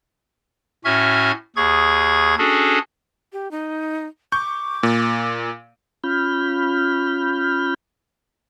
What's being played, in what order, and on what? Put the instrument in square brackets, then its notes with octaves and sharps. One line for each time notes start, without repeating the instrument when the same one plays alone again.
[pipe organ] A2 C#4 F#4 E5 F6 G#6
D#2 G#4 C#6 G#6
C#4 D4 F#4 G#4 A4
[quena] G4
D#4
[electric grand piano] C#6 G6 [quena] D6
[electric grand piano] A#2
[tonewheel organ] C#4 F4 B5 F6 G6